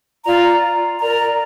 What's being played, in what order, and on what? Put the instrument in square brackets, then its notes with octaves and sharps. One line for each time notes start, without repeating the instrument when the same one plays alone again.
[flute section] F4 D5 A#5
A#4 D5 A#5